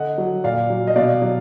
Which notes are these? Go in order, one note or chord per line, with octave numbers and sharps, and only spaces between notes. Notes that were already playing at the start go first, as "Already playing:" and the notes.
Already playing: D3 D#5 F#5
F#3
A#2 D5 F5
F#3
D#5
B2 D5 F5
F#3